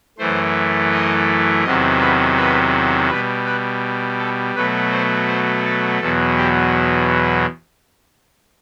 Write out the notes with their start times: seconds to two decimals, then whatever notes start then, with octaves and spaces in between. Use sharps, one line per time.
0.18 F#2 E3 A3 C5
0.91 D#5
1.64 E2 C3 D#3 F#3 D#5
2.00 B4
2.37 B4
3.09 B2 G3 B4
3.45 B4
4.19 A4
4.55 B2 F#3 A3 B4
4.91 C5
5.28 C5
5.65 A4
6.00 E2 B2 F#3 A4
6.37 G4